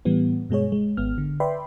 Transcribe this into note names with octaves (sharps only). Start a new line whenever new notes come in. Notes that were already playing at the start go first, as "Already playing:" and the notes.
A2 E3 G3 B3
G2 B2 G#3 G#4 C#5
G#3
G#1 B3 F6
D3
B4 D5 E5 G5 B5 C6